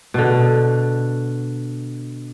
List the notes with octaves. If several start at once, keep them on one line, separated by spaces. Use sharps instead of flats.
B2 D3